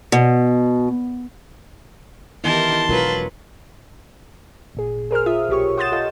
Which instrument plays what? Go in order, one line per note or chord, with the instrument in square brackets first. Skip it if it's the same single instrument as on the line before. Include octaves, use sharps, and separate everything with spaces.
[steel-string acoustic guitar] B2
[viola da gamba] D#3 G4 A#4 [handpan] E3 B3 E4 [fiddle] A5 C6
[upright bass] E1 B2 [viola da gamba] F#3 B4 [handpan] F4 A#4
[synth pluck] G#1 A#2 G#4
G#4 A#4 C5 F6
F4 E5 D#6
B1 G4 C#5 C#6
F#5 C6 D#6 G6 A6 E7
F4 A4 D#5 F5